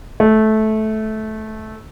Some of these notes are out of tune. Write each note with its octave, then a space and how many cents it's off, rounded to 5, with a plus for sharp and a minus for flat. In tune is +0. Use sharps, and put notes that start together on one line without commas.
A3 -15